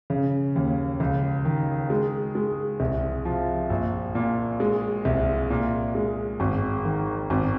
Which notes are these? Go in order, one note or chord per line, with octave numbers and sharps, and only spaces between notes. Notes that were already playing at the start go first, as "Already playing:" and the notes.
C#3
D#2
C#2
D#3
G#3
G#3
C2
F3
A#1
A#2
G#3
C2
A#2
G#3
G#1
D#3
G#1